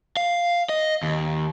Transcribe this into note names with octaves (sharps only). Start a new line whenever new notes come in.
F5
D#5
D#2